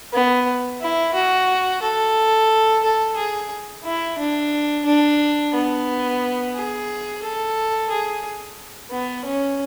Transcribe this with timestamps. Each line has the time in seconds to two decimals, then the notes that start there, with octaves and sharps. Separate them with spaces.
0.13 B3
0.81 E4
1.14 F#4
1.82 A4
2.83 A4
3.16 G#4
3.84 E4
4.18 D4
4.85 D4
5.54 B3
6.55 G#4
7.23 A4
7.90 G#4
8.91 B3
9.25 C#4